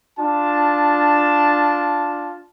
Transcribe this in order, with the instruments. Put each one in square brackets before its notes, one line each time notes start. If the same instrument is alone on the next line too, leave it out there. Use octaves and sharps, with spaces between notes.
[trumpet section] D4 F4 A5